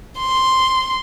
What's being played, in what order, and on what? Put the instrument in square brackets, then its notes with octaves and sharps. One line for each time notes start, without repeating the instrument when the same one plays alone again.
[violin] C6